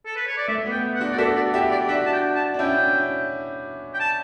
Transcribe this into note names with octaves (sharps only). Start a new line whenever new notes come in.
A4
B4
C#5
D5
A3 E5
B3
G5
F#5
D4 F#4
D5
F#4 A4 E5
D5
E4 G4 E5
D5
D4 F#4 E5
A5
G5
A5
D4
C#4 E4 G5
G5
A5